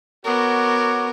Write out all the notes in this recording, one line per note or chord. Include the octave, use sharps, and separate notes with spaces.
B3 F#4 A#4 C#5 D6